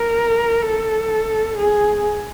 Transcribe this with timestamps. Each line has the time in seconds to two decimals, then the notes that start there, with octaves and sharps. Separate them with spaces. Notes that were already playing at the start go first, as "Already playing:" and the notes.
Already playing: A#4
0.62 A4
1.57 G#4